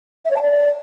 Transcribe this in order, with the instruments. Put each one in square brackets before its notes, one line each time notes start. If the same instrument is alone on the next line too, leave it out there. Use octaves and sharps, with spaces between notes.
[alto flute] E5
C#5
A5
D5